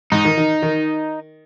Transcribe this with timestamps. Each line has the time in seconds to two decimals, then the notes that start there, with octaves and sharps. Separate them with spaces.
0.12 G#2 D#4
0.25 D#3
0.38 D#3
0.62 D#3